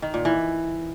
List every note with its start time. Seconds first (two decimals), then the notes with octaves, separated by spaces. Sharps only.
0.02 D#3
0.14 A#2
0.25 E3